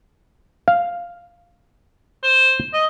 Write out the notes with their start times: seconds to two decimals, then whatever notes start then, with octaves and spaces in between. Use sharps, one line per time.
0.68 F5
2.23 C5
2.74 D#5